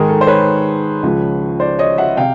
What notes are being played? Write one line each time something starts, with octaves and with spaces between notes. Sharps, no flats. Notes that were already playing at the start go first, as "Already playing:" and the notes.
Already playing: G#2 D#3 G#3 G#4 A#4
A4
C5
B4 C#5
C#2 C#3 F3
C5 D5
C#5 D#5
E5 F#5
C3 F5 G5